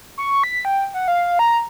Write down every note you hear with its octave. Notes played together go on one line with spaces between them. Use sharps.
C#6
B6
G5
F#5
F5
A#5